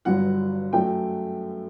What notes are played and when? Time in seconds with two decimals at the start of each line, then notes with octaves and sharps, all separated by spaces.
0.05 G1 G2 F#3 F#5
0.73 F#2 F#3 A3 G5